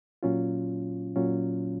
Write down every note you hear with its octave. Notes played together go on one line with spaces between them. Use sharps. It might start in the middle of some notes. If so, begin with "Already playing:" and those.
A#2 F#3 C#4 F4
A#2 F#3 C#4 F4